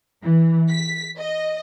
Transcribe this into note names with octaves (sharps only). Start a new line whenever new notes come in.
E3
B6
D#5